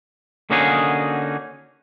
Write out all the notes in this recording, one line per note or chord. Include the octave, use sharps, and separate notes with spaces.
D3 A#3 C#4 D#4 F#4 G#4